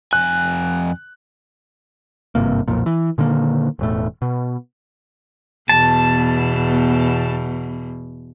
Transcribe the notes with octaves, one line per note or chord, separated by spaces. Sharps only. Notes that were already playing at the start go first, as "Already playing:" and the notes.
F2 G#5 F#6
G#1 G2 C3 A#3
B1 F2 A#2
E3
A#2 D3 D#3 A#3
E1 A2 A3
B2
E2 B2 A5